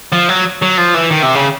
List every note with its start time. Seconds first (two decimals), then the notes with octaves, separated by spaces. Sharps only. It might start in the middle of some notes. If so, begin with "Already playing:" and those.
0.12 F3
0.29 F#3
0.62 F#3
0.78 F3
0.94 E3
1.11 D#3
1.23 C3
1.35 C#3